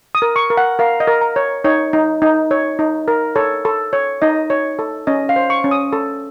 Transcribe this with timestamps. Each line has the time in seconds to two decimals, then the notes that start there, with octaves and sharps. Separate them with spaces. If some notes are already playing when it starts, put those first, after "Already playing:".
0.15 D#6
0.22 A#4
0.36 C#6
0.50 A#4
0.57 F#5
0.79 A#4 F5
1.00 D#5
1.07 A#4
1.21 A#5
1.36 C#5
1.64 D#4 C#5
1.93 D#4
2.22 D#4
2.51 C#5
2.79 D#4
3.08 A#4
3.36 A4 C#5
3.65 A4
3.93 C#5
4.22 D#4 D#5
4.50 C#5
4.79 A4
5.07 C#4 D#5
5.29 F5
5.36 C5
5.50 C#6
5.64 C#4
5.71 D#6
5.93 A4